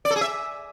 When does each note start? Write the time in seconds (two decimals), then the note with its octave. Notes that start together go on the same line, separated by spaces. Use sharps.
0.05 D5
0.10 A4
0.16 G#4
0.21 E5